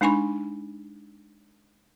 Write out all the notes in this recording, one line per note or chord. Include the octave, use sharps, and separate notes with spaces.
G#3 D4 D#4 G#5 B5 C#6